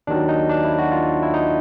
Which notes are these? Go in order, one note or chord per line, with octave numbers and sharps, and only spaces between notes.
D#2 D#3 F#3 D4
D#4
D4
E4
F#4
F4
E4
D#4